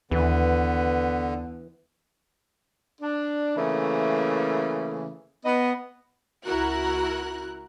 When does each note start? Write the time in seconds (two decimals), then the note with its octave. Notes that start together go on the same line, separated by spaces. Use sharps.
0.11 D#2 D3 E3 B3
3.01 D4
3.56 C#3 E3 A3 A#3
5.44 B3 D#5
6.44 C#2 E4 F#4 A#4 F#6